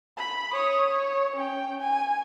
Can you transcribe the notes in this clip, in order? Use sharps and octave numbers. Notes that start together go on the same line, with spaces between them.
B5
C#5 D#6
C#5
C#4 G5
G#5